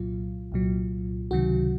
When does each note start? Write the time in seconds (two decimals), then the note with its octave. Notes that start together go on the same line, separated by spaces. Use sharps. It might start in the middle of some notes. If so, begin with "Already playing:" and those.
Already playing: C2 A#2 F#3 F4
0.52 C2 A#2 F#3
1.31 C#2 C3 D#3 F#3 F#4